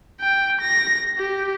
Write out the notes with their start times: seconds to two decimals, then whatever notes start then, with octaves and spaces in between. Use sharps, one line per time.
0.20 G5
0.61 A#6
1.18 G4